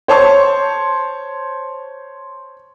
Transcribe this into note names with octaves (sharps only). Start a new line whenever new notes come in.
C5 C#5 A5 C6 C#6